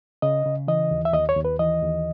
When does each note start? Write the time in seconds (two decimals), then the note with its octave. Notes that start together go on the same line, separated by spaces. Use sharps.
0.22 C#3 D#5
0.46 C#3
0.68 E3 D#5
0.91 D#2
1.05 E5
1.13 D#2 D#5
1.29 C#5
1.36 D#2
1.45 B4
1.59 E3 D#5
1.83 D#2